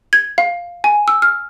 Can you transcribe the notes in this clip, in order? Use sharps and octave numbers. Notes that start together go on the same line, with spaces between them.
G#6
F5
G#5
E6
F6